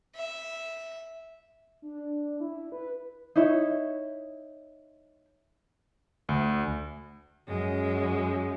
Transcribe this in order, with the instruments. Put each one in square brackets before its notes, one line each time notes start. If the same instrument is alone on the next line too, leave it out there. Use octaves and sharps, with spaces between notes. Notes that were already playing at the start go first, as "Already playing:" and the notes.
[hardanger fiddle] E5
[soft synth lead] D4
E4
B4
[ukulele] D#4 E4 C#5
[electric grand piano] D2
[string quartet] F#2 G#3